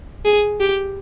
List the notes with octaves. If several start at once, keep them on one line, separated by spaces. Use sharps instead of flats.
G#4
G4